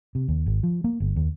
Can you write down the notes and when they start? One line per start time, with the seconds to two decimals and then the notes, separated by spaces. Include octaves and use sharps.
0.15 C3
0.28 D#2
0.46 G#1
0.63 F3
0.84 A#3
1.00 G1
1.16 D#2